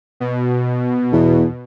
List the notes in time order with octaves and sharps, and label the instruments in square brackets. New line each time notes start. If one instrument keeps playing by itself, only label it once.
[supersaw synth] B2
[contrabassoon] E2